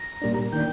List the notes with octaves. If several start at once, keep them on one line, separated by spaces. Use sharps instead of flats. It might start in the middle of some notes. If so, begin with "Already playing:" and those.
Already playing: A#5
A#2 G3 A#3 D4
D#3 A#3 D4 G5